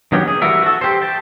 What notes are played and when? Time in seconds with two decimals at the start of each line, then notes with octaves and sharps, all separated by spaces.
0.12 D#3 F#3 B3 C#4 G4
0.28 G#4
0.42 E3 G3 F#4 A#4 E5
0.62 F#4 A4
0.81 G4 C5
1.01 G5 A5